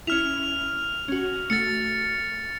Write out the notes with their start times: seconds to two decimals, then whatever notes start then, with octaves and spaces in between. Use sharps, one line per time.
0.07 C#4 E4 F6 F7
1.08 C#4 F#4
1.50 A3 F#4 A6 C#7